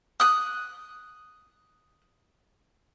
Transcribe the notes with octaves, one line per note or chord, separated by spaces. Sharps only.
D#6 F#6